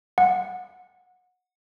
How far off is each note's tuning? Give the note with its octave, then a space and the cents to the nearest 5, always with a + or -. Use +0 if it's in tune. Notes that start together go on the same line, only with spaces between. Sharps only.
F#5 -20